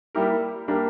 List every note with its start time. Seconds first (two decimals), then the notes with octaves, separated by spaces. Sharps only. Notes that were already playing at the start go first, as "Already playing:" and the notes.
0.15 G3 A#3 E4 G4 A#4
0.68 G3 A#3 D4 G4 A#4